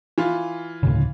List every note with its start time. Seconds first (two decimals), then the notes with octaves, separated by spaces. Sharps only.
0.18 E3 F4
0.83 D2 A2 C#3